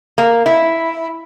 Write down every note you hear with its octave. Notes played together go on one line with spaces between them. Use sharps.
A#3
E4